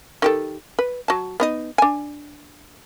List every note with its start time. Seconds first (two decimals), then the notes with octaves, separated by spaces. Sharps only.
0.22 D#3 G4 A4
0.79 B4
1.08 F#3 A5
1.40 B3 D#4 D#5
1.78 D4 G#5